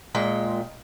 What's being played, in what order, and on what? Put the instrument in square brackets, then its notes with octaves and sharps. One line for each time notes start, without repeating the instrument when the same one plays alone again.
[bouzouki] A#2 G#3 G5